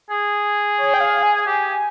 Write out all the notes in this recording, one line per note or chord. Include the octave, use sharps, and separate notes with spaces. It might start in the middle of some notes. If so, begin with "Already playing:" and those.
G#4
C#5
G5
F5
G#5
G4